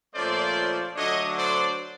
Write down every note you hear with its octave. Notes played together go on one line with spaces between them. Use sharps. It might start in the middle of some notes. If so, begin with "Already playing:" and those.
A#2 F3 A3 C#4 C5 D5
D3 F#3 A3 D4 C#5 D#5
C5 D5